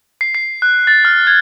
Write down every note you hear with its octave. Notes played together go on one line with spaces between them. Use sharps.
C7
C7
F#6
A6
F6
G#6